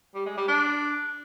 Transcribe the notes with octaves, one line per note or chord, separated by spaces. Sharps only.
G3
G#3
G3
D4